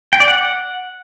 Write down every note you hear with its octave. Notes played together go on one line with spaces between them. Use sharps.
G5
D5
F#5